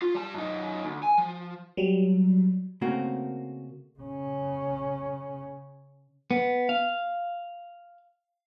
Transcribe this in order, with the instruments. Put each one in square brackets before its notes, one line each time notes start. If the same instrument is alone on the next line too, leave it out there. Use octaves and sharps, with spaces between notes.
[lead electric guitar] F4
G3 A5
F#2 D#4
D2
G#5
F3
[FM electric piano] F#3 G3
[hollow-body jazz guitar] C#3 A3 A#3 C4 F#4 A#4
[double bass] C#3 C#4
[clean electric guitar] B3
F5